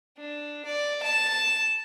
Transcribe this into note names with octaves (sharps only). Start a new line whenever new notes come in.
D4
D5
A5